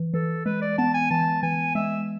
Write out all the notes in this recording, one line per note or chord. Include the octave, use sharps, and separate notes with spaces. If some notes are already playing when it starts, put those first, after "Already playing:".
Already playing: E3
E3 A4
G#3 B4
D5
B3 A5
G#5
E3 A5
E3 G#5
G#3 E5